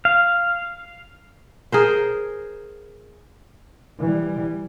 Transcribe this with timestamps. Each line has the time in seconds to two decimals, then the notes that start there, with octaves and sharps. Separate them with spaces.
0.05 F5
1.72 G#4 A#4 C5
4.00 E3 G3